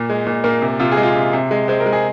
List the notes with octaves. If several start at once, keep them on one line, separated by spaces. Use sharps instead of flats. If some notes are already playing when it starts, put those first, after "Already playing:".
Already playing: A#2
G#3
A#2
A#2 A#3
C3
C3 F4
G#4
G#3
F4
C3
C3
G#3
G#3 C4
A#4
G#3
G#4